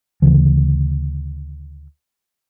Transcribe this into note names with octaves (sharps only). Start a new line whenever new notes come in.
D2 C#3 E3 F3